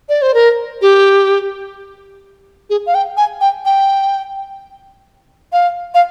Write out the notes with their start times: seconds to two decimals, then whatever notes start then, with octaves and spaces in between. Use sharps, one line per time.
0.09 D5
0.22 C5
0.34 A#4
0.82 G4
2.70 G#4
2.86 F5
2.94 G5
3.17 G#5
3.41 G5
3.65 G5
5.52 F5
5.94 F5